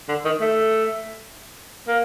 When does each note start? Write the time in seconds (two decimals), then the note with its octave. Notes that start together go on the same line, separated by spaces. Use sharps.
0.08 D3
0.25 D#3
0.41 A3
1.88 A#3